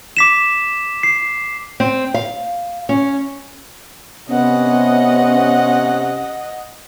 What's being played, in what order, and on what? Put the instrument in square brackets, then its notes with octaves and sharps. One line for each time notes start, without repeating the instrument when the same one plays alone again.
[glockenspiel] D6 B6 E7
C7
[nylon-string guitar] C4
F5
C#4
[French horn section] C3 C#4 [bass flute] B3 [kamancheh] D#5 F#5